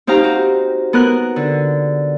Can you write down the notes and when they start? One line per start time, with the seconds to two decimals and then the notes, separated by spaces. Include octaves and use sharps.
0.07 C4 D#4 G4 F5 A#5
0.24 F#4
0.93 B3 A#4 F#6
1.36 D3